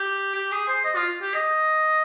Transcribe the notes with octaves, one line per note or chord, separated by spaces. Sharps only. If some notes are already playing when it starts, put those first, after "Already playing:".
Already playing: G4
G4
G#4
C5
D#5
F4
G4
D#5